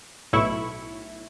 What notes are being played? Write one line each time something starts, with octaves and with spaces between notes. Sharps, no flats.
B1 A2 E4 C#6